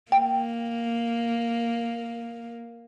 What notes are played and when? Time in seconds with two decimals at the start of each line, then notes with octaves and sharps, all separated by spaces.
0.12 A#3 G5